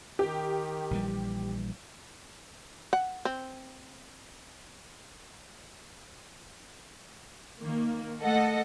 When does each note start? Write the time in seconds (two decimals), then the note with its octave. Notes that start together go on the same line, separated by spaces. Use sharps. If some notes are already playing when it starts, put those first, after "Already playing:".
0.19 D#3 G4
0.91 A#1 E3 G3
2.93 F#5
3.25 C4
7.61 D#3 A#3
8.21 A3 A4 D#5 F#5